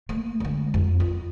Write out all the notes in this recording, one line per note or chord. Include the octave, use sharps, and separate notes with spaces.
A3 A#3
D3 G#3
F2
F4